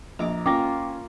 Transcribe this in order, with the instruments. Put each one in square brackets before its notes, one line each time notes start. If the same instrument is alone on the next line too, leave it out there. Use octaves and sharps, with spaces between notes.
[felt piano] A#1 D#5 [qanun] A#5 D6
[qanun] A#3 F4 [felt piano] C#4 A#6 [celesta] G5 D6